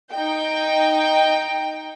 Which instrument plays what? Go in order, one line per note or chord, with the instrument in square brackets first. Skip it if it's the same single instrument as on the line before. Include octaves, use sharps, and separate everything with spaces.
[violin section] D#4 G5